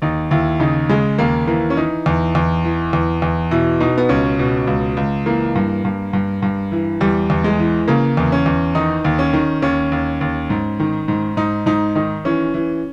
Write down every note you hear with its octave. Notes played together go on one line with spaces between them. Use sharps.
D#2 D#4
D#2 E4
C#3 D#4
C#3 G#3
D#2 A#3
E3 A#3
C#4
E3 D#4
E2
E2
E3
E2
E2
B2 E4
B2 D#4
B3
C#2 C#4
B2
C#2
C#2
E3 A#3
G2
G2
G2
G2
E3
E2 G3
E2
G#3
E3
C#3 A#3
E2
C#4
E2
D#3 D#4
D#2
C#4
D#3
D#2 C#4
D#2
D#2
G#2
D#3
G#2
G#2 D#4
G#2 D#4
D#3 D#4
E3 C#4
E3